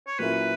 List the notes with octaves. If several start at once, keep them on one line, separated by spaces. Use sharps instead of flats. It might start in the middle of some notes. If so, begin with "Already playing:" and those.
C#5
A#2 F#3 C#4 E4 A#4 B4